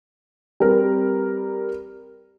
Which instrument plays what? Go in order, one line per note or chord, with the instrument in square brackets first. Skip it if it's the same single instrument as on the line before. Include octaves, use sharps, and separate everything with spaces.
[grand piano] G3 C4 A#4 B4